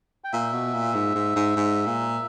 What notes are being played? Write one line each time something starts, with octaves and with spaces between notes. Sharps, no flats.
G5
A#2 E5
B2
A#2
G#2
G#2
G#2
G#2
A#2